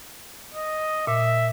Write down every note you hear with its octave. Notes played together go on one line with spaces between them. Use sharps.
D#5
A#2 E5